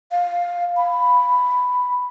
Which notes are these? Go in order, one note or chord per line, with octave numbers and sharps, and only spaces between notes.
F5
B5